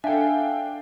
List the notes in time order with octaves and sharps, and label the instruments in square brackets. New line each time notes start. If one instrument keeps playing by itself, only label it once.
[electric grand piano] D4 G5 [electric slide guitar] A4 G#5 [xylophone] E5 [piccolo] F5